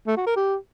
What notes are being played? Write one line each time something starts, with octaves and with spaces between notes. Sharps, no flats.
A3
F#4
A#4
G4